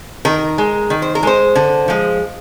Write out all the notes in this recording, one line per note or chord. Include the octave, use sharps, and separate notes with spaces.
D#3 A#4
G#3
D#3
C5
A#4
G#3 C5
D3
F3 G#3